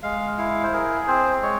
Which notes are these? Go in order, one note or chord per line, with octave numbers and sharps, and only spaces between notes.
G#3 F5
E4 F5
C5
G#4 A#4
C4 C5
G#3 C#5